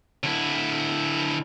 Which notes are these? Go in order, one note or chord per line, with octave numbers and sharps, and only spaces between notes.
D3 E4